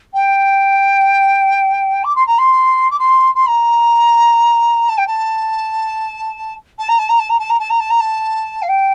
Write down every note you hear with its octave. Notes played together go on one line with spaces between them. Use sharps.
G5
D6
C6
A#5
C6
D6
C6
C6
A#5
A5
G5
A5
A5
A#5
A5
A#5
A5
A#5
A5
A#5
A5
A#5
A5
A#5
A5
F5
G5